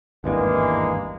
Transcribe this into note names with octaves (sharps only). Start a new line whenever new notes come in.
G#1 E2 G2 E3 G#3 A#3